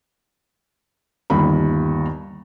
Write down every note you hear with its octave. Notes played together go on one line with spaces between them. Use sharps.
G1 D#2 B5